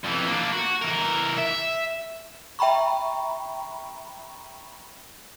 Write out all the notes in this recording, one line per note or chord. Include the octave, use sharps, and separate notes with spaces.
F2 E3
A#3 D4
F#4
E3 A#4
E5
E5 G5 A#5 B5 C#6